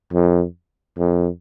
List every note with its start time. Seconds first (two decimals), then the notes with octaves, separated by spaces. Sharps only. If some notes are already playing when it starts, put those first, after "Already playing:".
0.13 F2
0.98 F2